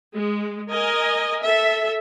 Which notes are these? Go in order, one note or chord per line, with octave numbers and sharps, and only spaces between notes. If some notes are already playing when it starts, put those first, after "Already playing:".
G#3
A#4 D#5 G#5
A4 E5